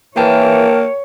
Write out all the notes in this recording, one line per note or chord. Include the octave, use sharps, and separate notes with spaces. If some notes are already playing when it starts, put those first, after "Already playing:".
E3 A#3 A#4 C#5 G5 A5